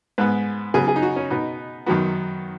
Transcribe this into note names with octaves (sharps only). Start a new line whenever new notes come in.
G#2 G#3 B3 B4
C#3 F#3 B3 G#4
G#4
D#4
F#4
C#4
B2 B3 D#4
F#2 D#3 F#3 B3 F#4